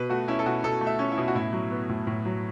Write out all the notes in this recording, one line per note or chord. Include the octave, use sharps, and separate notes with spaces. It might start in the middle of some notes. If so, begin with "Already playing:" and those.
Already playing: B2 B4
A3 F#4
C#4 E4
A4
B2 F#4
B2 A4
A3
E5
C#4
E4
B2
F#4
A2 E4
F#3
B3
A2
A2
F#3